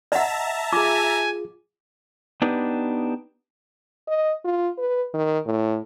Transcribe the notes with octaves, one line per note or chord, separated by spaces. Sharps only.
D#5 E5 F#5 A5 A#5
F4 G#4 G#5 D6
B3 D4 D#4 G4 B4
D#5
F4
B4
D#3
A2